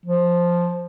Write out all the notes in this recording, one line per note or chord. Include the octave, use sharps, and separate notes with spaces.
F3